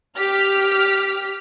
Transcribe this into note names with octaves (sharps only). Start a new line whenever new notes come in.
G4 F6 B6